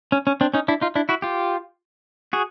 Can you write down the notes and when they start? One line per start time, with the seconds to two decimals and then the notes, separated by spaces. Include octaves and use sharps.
0.12 C#4
0.27 C#4
0.41 C4 D4
0.54 C#4 D#4
0.68 D4 E4
0.81 D#4 F4
0.96 D4 E4
1.09 E4 F#4
1.22 F4 G4
2.33 F#4 G#4